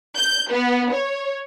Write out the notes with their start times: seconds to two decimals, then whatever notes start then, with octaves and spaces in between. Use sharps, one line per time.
0.15 G6
0.50 B3
0.92 C#5